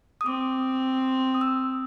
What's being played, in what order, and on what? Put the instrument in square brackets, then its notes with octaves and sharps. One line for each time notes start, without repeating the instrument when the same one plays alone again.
[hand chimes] D#6
[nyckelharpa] C4 [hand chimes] D6
[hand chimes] D#6
E6